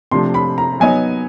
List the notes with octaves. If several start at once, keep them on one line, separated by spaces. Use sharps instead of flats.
C3 F3 A3 D4 C6
B5
A#5
F#3 B3 D#4 G#5